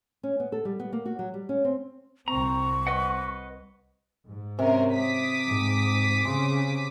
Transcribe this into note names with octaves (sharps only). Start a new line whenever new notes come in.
C#4
B3
A4
G3
B3
A#3
F#4
F#3
G3
C#4
C4
C2 C4 A#5 C#6
B4 D#5 F#5
G#2
C3 C4 C#4 A#4
D6 D#6 B6
G#2
C#3 C6